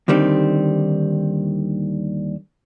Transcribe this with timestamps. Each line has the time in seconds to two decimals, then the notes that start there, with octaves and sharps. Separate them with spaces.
0.08 D#2 D3 D#3 G3 C4